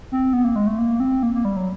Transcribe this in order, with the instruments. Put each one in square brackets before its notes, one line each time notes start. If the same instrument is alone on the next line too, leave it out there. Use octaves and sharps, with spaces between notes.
[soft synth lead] C4
B3
A#3
G#3
A3
A#3
C4
A#3
A#3
G3
F#3